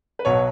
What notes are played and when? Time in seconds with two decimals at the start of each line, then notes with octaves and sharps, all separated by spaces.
0.19 B4
0.25 B1 B2 F#3 C#5